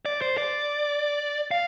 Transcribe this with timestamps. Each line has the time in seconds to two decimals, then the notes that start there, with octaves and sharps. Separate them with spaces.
0.05 D5
0.22 C5
0.38 D5
1.51 F5